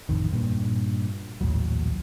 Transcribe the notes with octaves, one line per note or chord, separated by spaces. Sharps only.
A1 F2 D#3
G2 A#2
A#1 D#2 A2 F#3